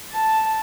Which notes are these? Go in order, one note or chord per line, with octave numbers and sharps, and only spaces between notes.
A5